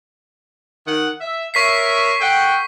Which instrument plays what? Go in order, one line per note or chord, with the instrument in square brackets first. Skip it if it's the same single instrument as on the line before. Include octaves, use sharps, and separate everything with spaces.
[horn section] D#3 F#5
E5
[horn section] A#4 C#5 E5 [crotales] C#6 B6 C7
[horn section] A4 F#5 G5